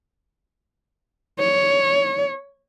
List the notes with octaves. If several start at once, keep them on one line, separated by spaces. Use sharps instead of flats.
C#5